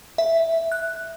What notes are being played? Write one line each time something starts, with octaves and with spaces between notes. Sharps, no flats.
E5
F#6